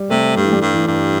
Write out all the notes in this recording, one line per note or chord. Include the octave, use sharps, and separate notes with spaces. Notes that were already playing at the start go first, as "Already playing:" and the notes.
Already playing: G3
C3 A3
G2 G3
E3
G3
G2
E3
G2